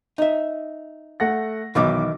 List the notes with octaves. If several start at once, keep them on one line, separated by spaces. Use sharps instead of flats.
D#4 E5
A3 F#5 A#6
B1 B2 D#3 E3 D6